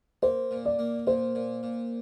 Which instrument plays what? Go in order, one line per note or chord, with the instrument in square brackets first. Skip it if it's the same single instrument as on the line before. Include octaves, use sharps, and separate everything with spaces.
[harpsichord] A#3 [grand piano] C5
[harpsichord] A#2
[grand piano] D5
[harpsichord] A#3
[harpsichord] A#2 [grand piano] C5
[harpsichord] A#2
A#2